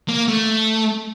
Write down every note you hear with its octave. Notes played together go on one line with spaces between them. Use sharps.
A#3
A3